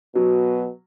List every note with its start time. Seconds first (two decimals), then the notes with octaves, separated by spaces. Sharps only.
0.15 B2 F#3